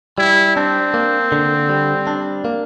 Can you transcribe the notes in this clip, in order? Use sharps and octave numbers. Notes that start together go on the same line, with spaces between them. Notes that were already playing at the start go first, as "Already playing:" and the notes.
G3 E4
C4 D4
A#3
D3
G3
D4
A#3